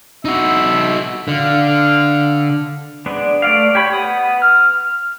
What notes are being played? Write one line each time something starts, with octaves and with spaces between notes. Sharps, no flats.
D#4 F#4 E5
D3 F5
G#3 B3 D4
A3 D5 F5
G4 C#5 B5
B3 B5 D#6
F6